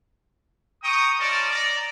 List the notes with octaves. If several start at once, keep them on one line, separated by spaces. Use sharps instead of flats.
G5 A#5 C#6 D#6
C#4 F4 A#4 D5 D#5 A5
D5 A#5